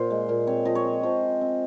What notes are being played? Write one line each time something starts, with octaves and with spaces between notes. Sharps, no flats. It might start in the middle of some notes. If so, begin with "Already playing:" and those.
Already playing: A#2 C5
G#3
A#2
C4 C#5
F3 D#5
C#5
C4
F3 C5
F3
C4